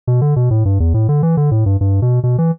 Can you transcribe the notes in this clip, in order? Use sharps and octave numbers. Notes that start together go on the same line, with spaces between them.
B2
D3
B2
A2
G2
E2
A2
D3
E3
D3
A2
G2
G2
B2
B2
E3